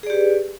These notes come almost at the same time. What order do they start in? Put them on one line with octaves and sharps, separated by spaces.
G#4 D5 G4 B4